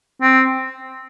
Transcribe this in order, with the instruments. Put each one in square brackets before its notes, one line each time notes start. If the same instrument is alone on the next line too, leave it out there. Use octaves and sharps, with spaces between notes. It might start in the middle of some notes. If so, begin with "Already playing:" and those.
[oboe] C4